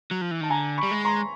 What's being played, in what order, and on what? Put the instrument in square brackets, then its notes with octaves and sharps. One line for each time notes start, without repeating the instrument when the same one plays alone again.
[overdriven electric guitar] F#3
F3
E3
[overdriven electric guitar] D#3 [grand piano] A5
[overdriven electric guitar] D3 [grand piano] G#5 A#5
[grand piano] B5 C#6
[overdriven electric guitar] G3
G#3
[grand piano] A#5 C6